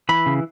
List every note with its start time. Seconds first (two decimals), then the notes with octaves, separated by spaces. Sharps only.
0.09 E3 B5
0.26 C#3